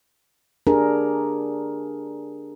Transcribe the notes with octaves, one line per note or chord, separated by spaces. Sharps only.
D4 G4 G#4 A#4